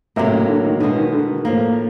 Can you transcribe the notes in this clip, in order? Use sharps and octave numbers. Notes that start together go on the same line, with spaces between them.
A2 C3 F#3 A#3
C#3
D3
D#3
B2 D3 G#3 B3
D#3
D3
D#3
A2 F3 A#3